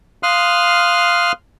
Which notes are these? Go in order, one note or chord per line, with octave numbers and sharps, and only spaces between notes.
F5 C6 D#6 F6 F#6